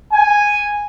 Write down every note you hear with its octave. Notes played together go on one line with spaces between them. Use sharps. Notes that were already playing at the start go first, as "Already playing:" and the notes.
G#5